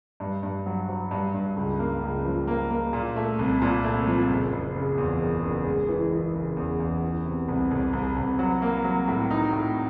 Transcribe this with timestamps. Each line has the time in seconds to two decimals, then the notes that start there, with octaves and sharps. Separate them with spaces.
0.20 G2
0.43 G2
0.66 F#3
0.89 F#3
1.11 G2
1.34 G2
1.56 C#2
1.79 A#3
2.02 C#2
2.25 F3
2.47 A#3
2.71 A#3
2.93 A#2
3.16 A3
3.39 C2
3.62 A#2
3.84 A3
4.07 F3
4.30 F#1
4.53 F#1
4.76 C#3
4.98 E2
5.21 F#1
5.43 F#1
5.66 G#3
5.89 E3
6.12 E3
6.35 C#3
6.57 E2
6.80 E2
7.03 E3
7.25 C3
7.48 C2
7.71 C2
7.93 C2
8.17 C2
8.39 F#3
8.62 A#3
8.85 F#3
9.08 A2
9.30 D#4
9.53 A2